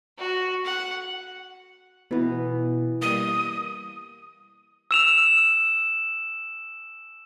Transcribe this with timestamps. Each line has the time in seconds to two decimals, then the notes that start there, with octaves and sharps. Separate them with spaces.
0.18 F#4
0.65 F#5
2.11 B2 E3 B3
3.02 G3 A#3 D#6
4.91 E6 E7 F7